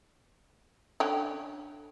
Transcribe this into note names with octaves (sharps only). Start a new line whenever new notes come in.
D3 C#4 G5